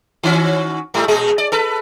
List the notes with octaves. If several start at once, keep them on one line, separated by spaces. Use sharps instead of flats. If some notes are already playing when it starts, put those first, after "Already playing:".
D#3 C#4 F#4
G#2 G3 A3
A#2 G#3 G#4
D5
A4 B4